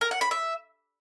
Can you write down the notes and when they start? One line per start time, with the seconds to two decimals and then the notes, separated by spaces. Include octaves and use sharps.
0.01 A#4
0.11 F#5
0.21 B5
0.31 E5